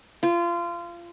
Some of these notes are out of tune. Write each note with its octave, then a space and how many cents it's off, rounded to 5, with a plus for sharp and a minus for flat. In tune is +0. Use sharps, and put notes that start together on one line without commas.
F4 -25